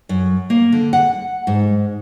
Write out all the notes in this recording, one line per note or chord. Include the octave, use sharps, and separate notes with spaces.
F#2
A#3
D3
F#5
G#2